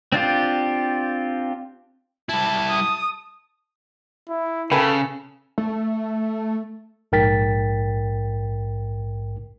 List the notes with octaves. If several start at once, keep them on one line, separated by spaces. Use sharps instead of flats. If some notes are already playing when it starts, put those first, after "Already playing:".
C4 D4 F4 G4
G3 E4 A5
D#6
E4
C#3 A4 B4 G5 G#5
A3
A#1 G#2 A#4 G5 A6 B6